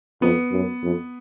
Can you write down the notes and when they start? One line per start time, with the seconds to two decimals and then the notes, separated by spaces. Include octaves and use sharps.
0.22 F2 B3
0.51 F#2
0.82 F2